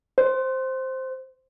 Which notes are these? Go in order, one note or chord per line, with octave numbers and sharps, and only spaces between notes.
C5